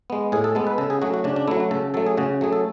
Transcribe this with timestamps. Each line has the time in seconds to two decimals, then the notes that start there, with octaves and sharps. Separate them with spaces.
0.10 G#3 B3
0.32 A2 G#4
0.44 A4
0.55 G#3 B3 A4
0.67 B4
0.78 C#3 A4
0.90 G#4
1.02 F#3 A3 F#4
1.14 F#4
1.24 C#3 D4
1.36 D4
1.48 A3 E4
1.51 F#3
1.60 F#4
1.71 C#3 A4
1.94 F#3 A3 A4
2.06 G#4
2.17 C#3 F#4
2.41 F#3 A3 G#4
2.53 A4